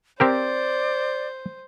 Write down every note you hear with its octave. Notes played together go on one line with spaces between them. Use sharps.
C4 G4 A#4 C5 D5